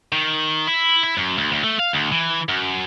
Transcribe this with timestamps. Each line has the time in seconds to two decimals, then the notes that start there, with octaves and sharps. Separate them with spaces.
0.12 D#3
0.67 E4
1.04 E4
1.17 F#2
1.38 D2
1.52 D2
1.64 A3
1.79 F5
1.93 D2
2.12 E3
2.49 F#2